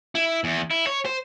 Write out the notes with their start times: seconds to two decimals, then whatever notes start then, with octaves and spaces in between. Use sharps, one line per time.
0.15 E4
0.44 E2
0.71 E4
0.87 C#5
1.06 C5